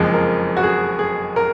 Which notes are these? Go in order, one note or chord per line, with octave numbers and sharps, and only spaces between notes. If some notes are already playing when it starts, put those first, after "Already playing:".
Already playing: F#1 F2 F3 G#3
A#4
F#4
G#4
G#4
A#4